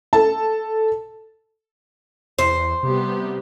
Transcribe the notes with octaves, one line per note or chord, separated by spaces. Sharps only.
A4 A5
E2 C5
C3 G3 B3 G4